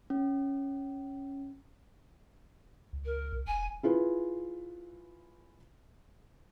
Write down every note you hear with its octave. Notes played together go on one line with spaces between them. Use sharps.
C#4
C#2
A#4
C2
E1 G#5
E4 F4 G#4 B4